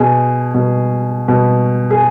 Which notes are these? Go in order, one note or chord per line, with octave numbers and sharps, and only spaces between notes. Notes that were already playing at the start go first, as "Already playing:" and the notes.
Already playing: B2 G#4
B2
B2
G#4